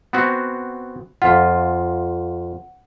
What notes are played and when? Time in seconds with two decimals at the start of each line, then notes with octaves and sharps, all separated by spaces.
0.13 B3 C4 F#4
1.22 F2 F4 F#5